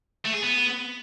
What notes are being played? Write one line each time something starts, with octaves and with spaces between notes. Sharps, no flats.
A3
G#4
B3